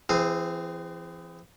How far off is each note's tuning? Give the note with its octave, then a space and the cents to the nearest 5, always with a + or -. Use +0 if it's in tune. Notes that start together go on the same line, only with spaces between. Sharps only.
E3 +35 C4 +0 G#4 +0